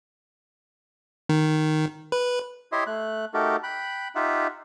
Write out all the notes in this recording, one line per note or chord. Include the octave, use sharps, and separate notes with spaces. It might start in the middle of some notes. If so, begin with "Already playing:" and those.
D#3
B4
E4 G4 C#5 D#5 E5 C6
A3 F#6
A3 D#4 F#4 G4 A4 A#4
G5 B5 F#6
D#4 F4 G4 E5 F#5